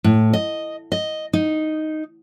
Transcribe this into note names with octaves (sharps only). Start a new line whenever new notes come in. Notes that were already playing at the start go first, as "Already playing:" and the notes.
A2
D#5
D#5
D#4